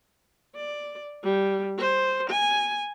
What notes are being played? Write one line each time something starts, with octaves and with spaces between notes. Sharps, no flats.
D5
G3
C5
G#5